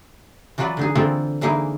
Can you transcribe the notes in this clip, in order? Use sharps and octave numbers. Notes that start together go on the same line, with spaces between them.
E3 F#3 F4 B4 D5
D3 D#4 G#4
D3 E3 A#3 C4 F4 A4
D3 E3 G#3 A#3 D#4 E4